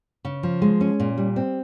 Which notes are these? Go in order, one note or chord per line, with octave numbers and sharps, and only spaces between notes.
C#3
F3
G#3
C#4
A#2
G3
C4